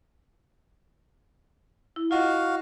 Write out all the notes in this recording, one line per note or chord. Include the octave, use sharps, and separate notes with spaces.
E4
F4 F#4 D#5 F5 F#5